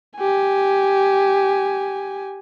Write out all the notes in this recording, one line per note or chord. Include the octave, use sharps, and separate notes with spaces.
G4 G#5